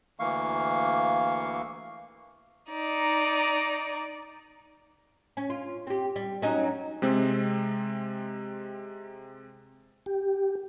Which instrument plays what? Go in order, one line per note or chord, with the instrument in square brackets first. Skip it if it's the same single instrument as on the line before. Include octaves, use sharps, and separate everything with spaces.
[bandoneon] D2 E3 A#3 F5 C#6
[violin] D#4 D5
[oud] C#4
F4
C4 G4
G3
F#3 C#4 D#4
[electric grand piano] C3 G#3 C4
[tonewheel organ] G4